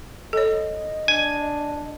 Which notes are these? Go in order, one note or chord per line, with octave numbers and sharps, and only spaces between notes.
A4 C#5 D#5
D4 G#5